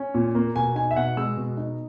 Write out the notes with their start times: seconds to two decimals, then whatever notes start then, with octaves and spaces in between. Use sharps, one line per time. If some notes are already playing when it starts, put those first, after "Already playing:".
Already playing: C#4
0.14 A#2
0.35 A#3
0.56 B2 G#5
0.75 D#4 G#5
0.91 E5
0.96 B2 F#5
1.17 G#3 E6
1.37 B2
1.57 D#4